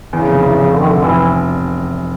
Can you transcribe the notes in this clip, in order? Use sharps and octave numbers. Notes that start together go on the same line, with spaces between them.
E2 C#3
F1
E2
F1
F1 D3
D#3
F1 D3
F1 E3